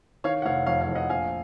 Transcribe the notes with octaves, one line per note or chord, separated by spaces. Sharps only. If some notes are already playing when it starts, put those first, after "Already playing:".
D#3 C#5 F5
F#5
F1 C#5 F5
F2 C#5 F5
C#5 F5
F2
D#5 F#5
A#1 F5 G#5